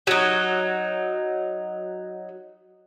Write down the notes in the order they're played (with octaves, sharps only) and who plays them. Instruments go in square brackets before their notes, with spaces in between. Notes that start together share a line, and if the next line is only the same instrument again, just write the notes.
[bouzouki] F#3 D#4